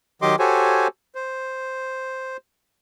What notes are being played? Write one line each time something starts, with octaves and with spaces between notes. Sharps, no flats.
D#3 F#3 G4 D#5 C6 D6
F#4 G4 A4 C5 C#5 G#5
C5